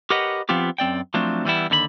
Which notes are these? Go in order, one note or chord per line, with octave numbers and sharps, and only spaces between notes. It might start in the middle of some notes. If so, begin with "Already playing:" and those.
G4 A#4 B4 C#5 D#5 F#5
F3 B3 C4 F4 G4
F#2 C4 D5 G5
F3 F#3 A3 C4 D4
E3 G3 B3 E4
D#2 D3 A#4 B5